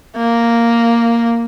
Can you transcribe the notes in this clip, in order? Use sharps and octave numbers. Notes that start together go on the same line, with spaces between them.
A#3